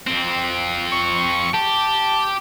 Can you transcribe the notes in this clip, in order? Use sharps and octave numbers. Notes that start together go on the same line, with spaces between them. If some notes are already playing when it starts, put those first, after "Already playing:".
F2 C4
C#6
G4 A5